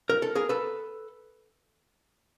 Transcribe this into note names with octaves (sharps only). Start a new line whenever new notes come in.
A#4
A4
G#4 A#4
A4 B4